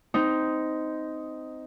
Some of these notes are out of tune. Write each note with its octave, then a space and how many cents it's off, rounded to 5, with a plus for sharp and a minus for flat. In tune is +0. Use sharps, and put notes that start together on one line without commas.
C4 -15 D#4 +5